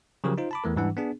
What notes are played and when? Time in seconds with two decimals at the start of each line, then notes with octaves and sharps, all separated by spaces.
0.24 C#3 F3 F#3 G4 A#4
0.38 D#4 F4 C5
0.51 A5 B5 D6
0.64 E2 E3 A3 A#4
0.76 G#2 E3 G3 D4 F#5
0.97 B3 D4 G#4